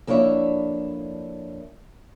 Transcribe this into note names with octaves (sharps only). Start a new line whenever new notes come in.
F2 A#3 D4 E4 C#5 E5